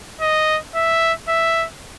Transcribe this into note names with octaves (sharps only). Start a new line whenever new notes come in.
D#5
E5
E5